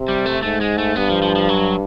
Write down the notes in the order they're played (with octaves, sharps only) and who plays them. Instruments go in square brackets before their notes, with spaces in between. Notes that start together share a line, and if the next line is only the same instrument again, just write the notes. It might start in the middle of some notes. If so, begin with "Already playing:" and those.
Already playing: [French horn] C3
[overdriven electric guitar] G3
A3
[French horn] G#2 [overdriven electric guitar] A3
[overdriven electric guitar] G#3
A3
[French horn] G2 [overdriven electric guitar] B3
[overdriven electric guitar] F3
F3
F3
F#3